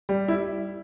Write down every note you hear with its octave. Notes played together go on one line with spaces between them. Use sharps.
G3
E4